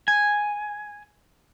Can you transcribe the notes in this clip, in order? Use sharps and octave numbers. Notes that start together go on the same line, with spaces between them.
G#5